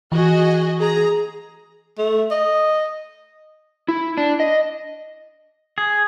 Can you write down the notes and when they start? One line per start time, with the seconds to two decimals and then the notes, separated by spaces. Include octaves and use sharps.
0.12 E3 F#4 G#4 D#5
0.80 G#4 A#5
1.98 A3
2.31 D#5
3.88 E4
4.17 D4
4.40 D#5
5.78 G#4